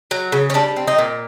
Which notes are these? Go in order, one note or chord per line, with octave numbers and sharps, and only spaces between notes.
F#3
C#3
C#4
G3 D4
C4
D#4
A#2